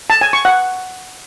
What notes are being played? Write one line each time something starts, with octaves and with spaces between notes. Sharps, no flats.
A5
G#5
C#6
F#5